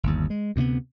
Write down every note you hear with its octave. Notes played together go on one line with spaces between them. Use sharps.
G1 D#2
G#3
D2 C3 G#3 B3